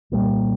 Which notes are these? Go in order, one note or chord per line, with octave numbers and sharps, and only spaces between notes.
C2 A#2 G3